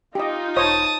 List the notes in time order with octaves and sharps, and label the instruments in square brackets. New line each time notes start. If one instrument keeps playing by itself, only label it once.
[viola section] D#4 F4 [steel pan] G4 D#5
[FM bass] E1 [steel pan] C5 C#5 D#5 [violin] A5 D#6